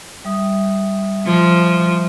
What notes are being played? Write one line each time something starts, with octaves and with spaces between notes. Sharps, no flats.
G3 E5 D#6
F3